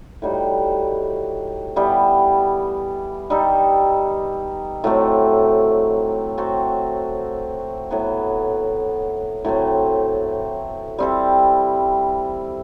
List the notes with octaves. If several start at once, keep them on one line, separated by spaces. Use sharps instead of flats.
A2 G3 D#4 F#4
E3 G3 B3
G3 D#4 A4
A2 F#3 A3 C4
F#3 C4 F#4 A4
A2 F#3 B3
A2 F#3 A3 C4
G3 C4 E4 A4